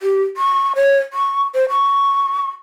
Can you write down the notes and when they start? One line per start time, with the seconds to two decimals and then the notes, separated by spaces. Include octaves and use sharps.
0.02 G4
0.37 C#6
0.76 C#5
1.13 C#6
1.55 C5
1.70 C#6